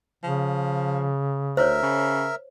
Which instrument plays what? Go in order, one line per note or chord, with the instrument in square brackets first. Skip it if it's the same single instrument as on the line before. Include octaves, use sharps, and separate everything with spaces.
[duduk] C#3 [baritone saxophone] F3
[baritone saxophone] D2 [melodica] A#4 E5 [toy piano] C5 C#5
[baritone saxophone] C#3